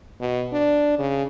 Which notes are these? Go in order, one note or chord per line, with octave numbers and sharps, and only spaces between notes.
B2
D4
C#3